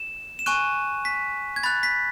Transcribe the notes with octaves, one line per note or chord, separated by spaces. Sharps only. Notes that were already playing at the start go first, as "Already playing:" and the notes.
Already playing: E7
E7
G#5 C#6 F#6 D#7
B6
G#6
B5 F#6 A6
B6